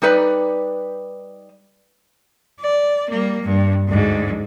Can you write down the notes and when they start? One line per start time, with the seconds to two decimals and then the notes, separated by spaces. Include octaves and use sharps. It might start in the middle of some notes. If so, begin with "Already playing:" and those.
0.02 G3 D#4 B4 D5
2.61 D5
3.10 G3 A#3
3.42 G2
3.88 D2 G#2